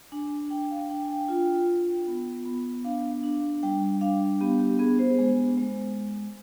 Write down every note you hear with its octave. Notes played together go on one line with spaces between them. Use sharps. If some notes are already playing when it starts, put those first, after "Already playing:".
D4 G#5
D4 G5
F5
D4 G5
G#5
G5
F4
F4
B3
B3
D4 F5
D4
G3 G5
D4 F5
B3 G4
G4
B3 G#4
C5
G#3
G#3